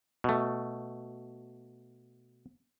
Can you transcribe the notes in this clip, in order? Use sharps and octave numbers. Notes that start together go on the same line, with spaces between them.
B2 A3